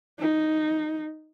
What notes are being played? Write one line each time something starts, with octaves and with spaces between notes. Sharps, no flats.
D#4